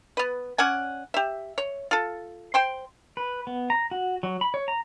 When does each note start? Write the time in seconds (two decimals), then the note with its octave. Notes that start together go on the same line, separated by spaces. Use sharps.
0.17 B3 B4
0.58 C#4 D5 F#5 G#5
1.14 G4 E5
1.58 C#5
1.91 F4 A4
2.54 C5 G5 C6
3.17 B4
3.47 B3
3.70 A#5
3.91 F#4
4.23 F#3
4.41 B5
4.54 C#5
4.68 A#5